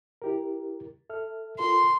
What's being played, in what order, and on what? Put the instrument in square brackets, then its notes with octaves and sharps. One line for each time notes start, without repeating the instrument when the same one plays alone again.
[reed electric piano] E4 G4 A#4
A4 E5 F6
[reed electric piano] F4 A4 A#4 [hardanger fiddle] C6